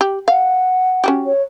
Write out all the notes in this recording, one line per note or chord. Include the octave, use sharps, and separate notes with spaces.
G4
F5 F#5
C#4 F#4 G4
C#5